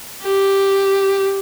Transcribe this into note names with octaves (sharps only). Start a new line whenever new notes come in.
G4